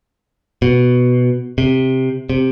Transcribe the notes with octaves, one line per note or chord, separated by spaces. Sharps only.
B2
C3
C3